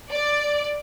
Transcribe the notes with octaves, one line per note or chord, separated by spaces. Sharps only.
D5